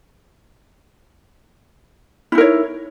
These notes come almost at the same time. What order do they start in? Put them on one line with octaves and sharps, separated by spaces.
E4 D#4 A#4 C#5